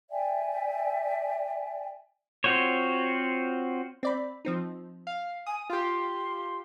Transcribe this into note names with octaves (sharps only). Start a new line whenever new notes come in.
D5 E5 G5 G#5
C4 F4 F#4 C5 C#5
C4 D5 B5
F3 C4 D#4
F5
G#5 D#6
F4 G4 C6